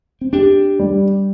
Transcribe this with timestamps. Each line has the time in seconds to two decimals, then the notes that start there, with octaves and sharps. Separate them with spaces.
0.21 C4
0.33 D4 G4
0.79 G3